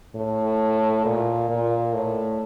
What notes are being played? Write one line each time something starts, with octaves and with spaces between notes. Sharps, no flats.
A2
A#2
A#2
A2